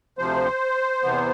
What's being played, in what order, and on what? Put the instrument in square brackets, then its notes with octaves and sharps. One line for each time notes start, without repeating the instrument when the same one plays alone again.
[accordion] D2 C3 F3 C5
E2 C3 E3 B3